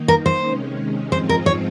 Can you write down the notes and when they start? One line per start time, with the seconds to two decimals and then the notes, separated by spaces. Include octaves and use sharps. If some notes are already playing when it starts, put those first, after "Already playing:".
Already playing: D#3 A#3 D#4
0.08 A#4
0.26 C5
0.43 C3 D#3 G#3 C#4
1.12 G#2 F3 G#3 C4 F4 C5
1.29 A#4
1.46 C#5